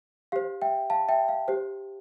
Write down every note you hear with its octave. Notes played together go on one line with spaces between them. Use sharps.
G4 C5 F5
E5 G5
F5 A5
E5 G5
F5
G4 C5